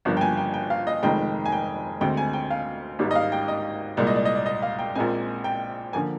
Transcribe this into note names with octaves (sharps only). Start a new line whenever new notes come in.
G1 G2 F3 A#3
G5
G#5
G5
G5
F5
D#5
F1 F2 D#3 G#3 G5
G#5
G5
D2 D3 G#3 C4 G5
G#5
G5
F5
G#1 G#2 G3
D#5
F5
G5
D#5
C2 A#2 G#3 D5
D#5
D5
D#5
D5
D#5
F5
G5
A#1 A#2 G#3 C4 G#5
G5
D3 F3 A#3 G#5